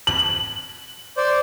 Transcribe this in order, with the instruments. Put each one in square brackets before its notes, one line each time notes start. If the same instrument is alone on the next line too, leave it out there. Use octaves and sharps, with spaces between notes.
[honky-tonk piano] F#7
[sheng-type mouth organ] C5 D5